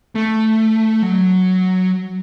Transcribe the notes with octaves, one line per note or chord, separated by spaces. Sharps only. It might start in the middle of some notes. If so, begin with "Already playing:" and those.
A3
F#3